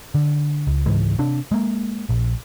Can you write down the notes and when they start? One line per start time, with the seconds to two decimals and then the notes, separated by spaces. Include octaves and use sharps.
0.15 D3
0.67 C#2
0.86 C#2 G#2 E3 G#3
1.19 C3 D4
1.52 G#3 A#3
2.09 A#1